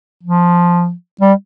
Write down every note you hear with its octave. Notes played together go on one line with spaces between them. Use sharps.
F3
G3